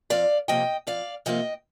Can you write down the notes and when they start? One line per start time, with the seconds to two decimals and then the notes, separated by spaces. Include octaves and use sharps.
0.10 F2 D5 F5
0.48 C3 F3 A#3 D#5 G5
0.87 F2 D5 F5
1.26 C3 F3 A#3 D#5 G5